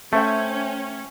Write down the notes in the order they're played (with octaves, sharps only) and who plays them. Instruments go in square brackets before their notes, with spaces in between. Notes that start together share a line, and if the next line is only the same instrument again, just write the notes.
[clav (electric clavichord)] A3 [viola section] C#4 [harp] C5 E5 G5